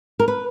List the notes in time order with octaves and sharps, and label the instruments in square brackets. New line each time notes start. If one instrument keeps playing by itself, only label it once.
[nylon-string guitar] A#4
B4